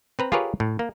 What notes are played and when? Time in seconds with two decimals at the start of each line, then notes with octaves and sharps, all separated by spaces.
0.19 C4 B4 A#5
0.32 F4 G4 G#4 A#4 B4 C#5
0.60 A2
0.79 A#3